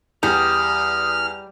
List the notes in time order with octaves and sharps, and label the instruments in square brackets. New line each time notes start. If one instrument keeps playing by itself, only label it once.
[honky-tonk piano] E2 [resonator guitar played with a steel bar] G3 [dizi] D#6 [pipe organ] F6